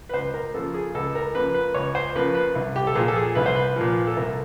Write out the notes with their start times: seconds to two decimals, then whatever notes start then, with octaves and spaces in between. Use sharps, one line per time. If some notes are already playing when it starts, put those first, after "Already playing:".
0.09 B4
0.13 C#2 C5
0.34 A#4
0.54 C#3 F3 A#3 A4
0.74 G#4
0.95 C#2 A4
1.15 A#4
1.35 C#3 F3 A#3 B4
1.54 B4
1.74 C#2 C#5
1.95 C5
2.15 C#3 F3 A#3 B4
2.35 B4
2.55 C2
2.76 G4
2.87 A4
2.95 A#2 F3 G#4
3.08 A4
3.16 G#4
3.35 C2 B4
3.46 C5
3.56 B4
3.76 A#2 F3
4.07 A4
4.17 C2 A#4